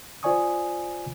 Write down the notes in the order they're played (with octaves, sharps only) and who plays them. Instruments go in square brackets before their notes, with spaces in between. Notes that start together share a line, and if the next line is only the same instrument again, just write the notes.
[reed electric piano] F4 C5 D5 G#5 C#6 D#6